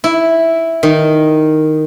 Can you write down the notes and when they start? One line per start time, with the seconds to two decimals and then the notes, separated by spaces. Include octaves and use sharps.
0.04 E4
0.83 D#3